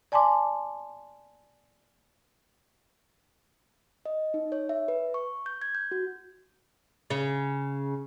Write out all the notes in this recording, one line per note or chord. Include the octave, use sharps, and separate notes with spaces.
D5 G#5 A5 C6 D6
D#5
D#4
C#5
E5
B4
C#6
G6
G#6
G6
F#4
C#3